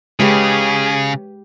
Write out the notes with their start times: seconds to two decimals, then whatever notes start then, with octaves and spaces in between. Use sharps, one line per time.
0.20 C#3 G#3 G4 G#4 B4 C#5